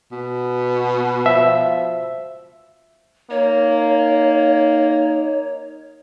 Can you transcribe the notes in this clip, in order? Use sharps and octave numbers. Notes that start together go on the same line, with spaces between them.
B2
F3 E5
A#3 D#4 C#5